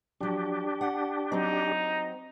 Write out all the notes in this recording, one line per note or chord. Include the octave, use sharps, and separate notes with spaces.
F3 F#3 D4 G4
F#5
F#3 C4 D#4